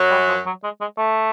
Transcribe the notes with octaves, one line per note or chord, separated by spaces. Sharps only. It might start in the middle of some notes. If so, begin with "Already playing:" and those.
Already playing: F#2 F#3
G3
F3
F#3
G#3
G#3
A3